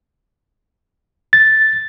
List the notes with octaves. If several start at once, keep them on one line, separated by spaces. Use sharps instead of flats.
A6